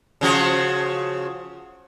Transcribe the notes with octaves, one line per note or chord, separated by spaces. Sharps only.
C#3 F3 F#4